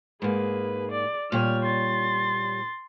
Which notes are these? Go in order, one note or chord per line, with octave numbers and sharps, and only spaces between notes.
G#2 A#3 G#4 B4
D5
A#2 G3 C#5 F6
C6 A6